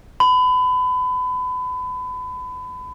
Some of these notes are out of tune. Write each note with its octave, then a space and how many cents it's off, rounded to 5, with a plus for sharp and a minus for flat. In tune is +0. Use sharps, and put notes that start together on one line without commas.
B5 +30